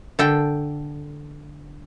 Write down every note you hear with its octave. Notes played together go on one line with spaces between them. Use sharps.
D3 A4 G5